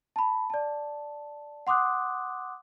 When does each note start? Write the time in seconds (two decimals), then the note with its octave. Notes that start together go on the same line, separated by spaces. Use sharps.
0.16 A5 B5
0.50 D5 A5
1.67 F#5 C6 D6 D#6 F#6